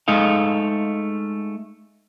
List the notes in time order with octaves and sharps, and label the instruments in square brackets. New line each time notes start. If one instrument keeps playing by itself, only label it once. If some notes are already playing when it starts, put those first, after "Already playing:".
[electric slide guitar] G#3 A3 D#4 F5